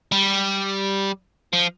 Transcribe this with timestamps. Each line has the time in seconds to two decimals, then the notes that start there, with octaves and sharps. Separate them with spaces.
0.12 G3
1.53 F3